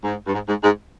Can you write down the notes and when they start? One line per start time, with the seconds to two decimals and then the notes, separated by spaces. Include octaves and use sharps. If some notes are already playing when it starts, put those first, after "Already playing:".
0.04 G#2
0.27 G2
0.34 G#2
0.48 G#2
0.63 G#2